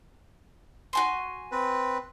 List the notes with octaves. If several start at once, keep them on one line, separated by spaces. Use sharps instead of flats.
F#4 G#5 C6
C4 B4